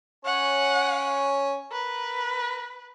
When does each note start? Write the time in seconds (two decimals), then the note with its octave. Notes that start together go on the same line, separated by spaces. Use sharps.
0.25 C#4 C#5 F#5 G#5
1.72 A#4 B4